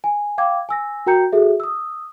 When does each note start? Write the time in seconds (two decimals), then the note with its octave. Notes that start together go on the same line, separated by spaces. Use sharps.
0.04 G#5
0.38 F5 G5 D6 G#6
0.69 G#5 E6 A#6
1.06 F#4 A#4 G5 A#5 G6 C#7
1.32 F#4 G#4 A4 E5
1.60 D#6 E6